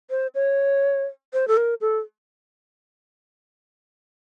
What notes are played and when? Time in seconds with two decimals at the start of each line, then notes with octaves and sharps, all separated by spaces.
0.10 C5
0.35 C#5
1.33 C5
1.48 A4
1.57 A#4
1.81 A4